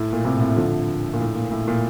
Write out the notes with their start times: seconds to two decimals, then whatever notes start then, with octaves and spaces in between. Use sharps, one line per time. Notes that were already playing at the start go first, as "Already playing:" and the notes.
Already playing: A2
0.13 A#2
0.25 A2 C3
0.40 A2 C3
0.56 D3 F3
1.13 A#2
1.20 A2
1.36 A#2
1.51 A2
1.68 A#2